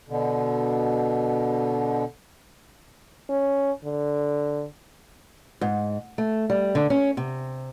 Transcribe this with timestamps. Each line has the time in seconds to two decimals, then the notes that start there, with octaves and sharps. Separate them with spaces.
0.09 B2 D3
3.30 C#4
3.84 D3
5.61 G#2
6.18 A3
6.50 G3
6.75 D3
6.90 C#4
7.17 C3